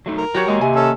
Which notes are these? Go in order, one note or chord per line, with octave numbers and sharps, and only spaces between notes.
F#3 A3 D#4
A#4
F#3 F#4 G4 C#5
G#3 A#3 D#5 A#5
C3 G#5
C#4 A4 E6